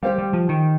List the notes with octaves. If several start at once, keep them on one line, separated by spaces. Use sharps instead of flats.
G3 G4 C5 F5
G3
F3
D#3